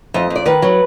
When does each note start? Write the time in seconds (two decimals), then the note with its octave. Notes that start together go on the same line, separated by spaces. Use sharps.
0.14 F2 D#5
0.30 F2
0.36 D5
0.45 D#3 B4
0.62 F#3